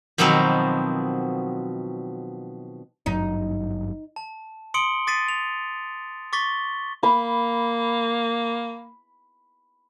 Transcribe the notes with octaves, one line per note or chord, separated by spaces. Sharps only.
B2 D#3 F3 F#3 B3 C4
G#1 G2 F#3 D#4
A5
C6 D#6 C#7 D7 F#7 G7
D6 D#6 A6 B6 C7 D#7
F7
C#6 D6 A6 B6 G7
A#3 B5